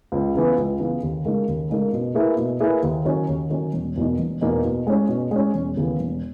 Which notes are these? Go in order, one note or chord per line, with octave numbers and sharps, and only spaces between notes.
C#2
C#3 E3 B3
C#2
C#3 E3 B3
D#2
C#3 G#3 D#4 A#4
D#2
C#3 G#3 D#4 A#4
B2
A#3 E4 G#4 B4
B2
A#3 E4 G#4 B4
D#2
D#3 F#3 C#4
D#2
D#3 F#3 C#4
E1
E2 B2 A#3 D#4
E1
E2 B2 A#3 D#4
B2
G#3 C#4
B2
G#3 C#4
E1
D#2 C#3 E3 B3
E1